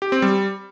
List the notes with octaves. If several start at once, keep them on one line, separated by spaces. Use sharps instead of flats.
G4
C4
G3